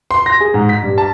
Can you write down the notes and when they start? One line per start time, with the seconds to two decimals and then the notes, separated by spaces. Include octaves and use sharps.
0.11 C6
0.26 A#6
0.40 G#4
0.54 G#2
0.69 B6
0.83 G2
0.98 A5